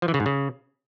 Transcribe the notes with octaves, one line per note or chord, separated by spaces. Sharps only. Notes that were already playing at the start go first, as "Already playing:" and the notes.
F3
E3
C#3
G#2
C#3